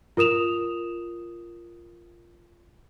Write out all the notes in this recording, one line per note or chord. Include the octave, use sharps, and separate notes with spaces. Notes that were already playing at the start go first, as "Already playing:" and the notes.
F4 A#4 D#6 E7 F7